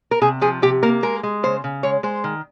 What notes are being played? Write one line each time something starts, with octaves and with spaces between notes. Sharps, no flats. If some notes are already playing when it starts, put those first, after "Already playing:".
A#4
C3 G#4
F3 G#4
C3 G4
A#3 A#4
G#3 A#4
G#3
C#3 C5
C#3
G#3 C#5
G#3 C5
D#3